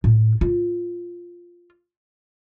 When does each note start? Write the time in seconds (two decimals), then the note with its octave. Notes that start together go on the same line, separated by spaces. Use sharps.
0.04 A2
0.41 F4